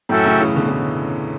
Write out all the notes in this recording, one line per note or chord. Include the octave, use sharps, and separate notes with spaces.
F#2 A2 C#4 F#4 A4 E5 G5
A2 C#3
C#3 E3
B2 D3
A2 C#3
B2